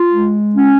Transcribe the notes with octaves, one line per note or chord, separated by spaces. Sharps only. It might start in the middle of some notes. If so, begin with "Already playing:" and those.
Already playing: F4
G#3
C#4